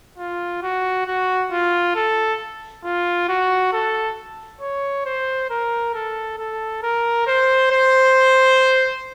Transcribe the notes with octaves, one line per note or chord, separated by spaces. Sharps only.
F4
F#4
F#4
F4
A4
F4
F#4
A4
C#5
C5
A#4
A4
A4
A#4
C5
C5